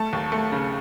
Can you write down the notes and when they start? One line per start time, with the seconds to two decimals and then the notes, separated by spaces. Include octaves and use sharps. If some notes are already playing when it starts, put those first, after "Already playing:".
Already playing: A3 A5
0.13 D#2
0.32 A3
0.52 C#3